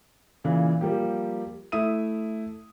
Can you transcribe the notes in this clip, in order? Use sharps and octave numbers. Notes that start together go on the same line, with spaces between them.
A#2 C#3 E3
F3 G3 A#3 G4
A3 E4 E5 D#6 D#7